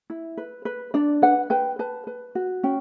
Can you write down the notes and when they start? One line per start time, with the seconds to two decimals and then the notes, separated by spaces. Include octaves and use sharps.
0.10 E4
0.37 B4
0.65 B4
0.94 D4 D5
1.22 B4 F#5
1.50 B4 G5
1.79 B4 A5
2.07 B4
2.35 F#4
2.63 C#4 G5